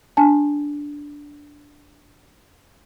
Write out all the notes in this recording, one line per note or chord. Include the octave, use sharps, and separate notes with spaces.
D4 G#5 A5